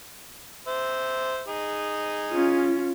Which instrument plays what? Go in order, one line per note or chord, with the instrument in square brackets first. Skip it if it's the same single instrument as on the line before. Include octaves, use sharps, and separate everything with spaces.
[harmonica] C5 E5
D#4 G#4
[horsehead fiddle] C#4 F4